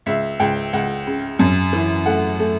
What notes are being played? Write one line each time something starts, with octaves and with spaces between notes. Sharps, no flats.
C#2 E5
C#2 G5
C#2 F#5
C#3
F#2
E3
A3 F#5
A3